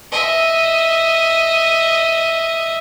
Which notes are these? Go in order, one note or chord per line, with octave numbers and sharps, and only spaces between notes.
D#5 E5